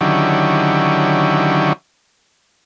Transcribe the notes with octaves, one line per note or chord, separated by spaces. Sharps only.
D3 D#3 F#3 C#4 E4 G4